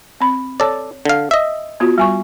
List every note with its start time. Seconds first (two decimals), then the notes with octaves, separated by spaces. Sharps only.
0.20 C4 B5
0.60 A4 C#5 D5
1.05 D3 F5
1.31 D#5 E5
1.80 B3 F4 F#4
1.98 G3 G#5 C#6